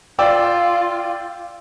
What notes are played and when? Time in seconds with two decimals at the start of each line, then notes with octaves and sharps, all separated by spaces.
0.19 F4 D5 G5 E6